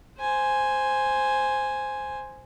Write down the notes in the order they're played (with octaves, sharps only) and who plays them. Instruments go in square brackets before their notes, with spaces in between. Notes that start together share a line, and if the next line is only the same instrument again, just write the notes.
[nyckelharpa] C5 G#5